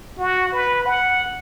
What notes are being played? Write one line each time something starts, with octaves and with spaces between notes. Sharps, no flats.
F#4
B4
F#5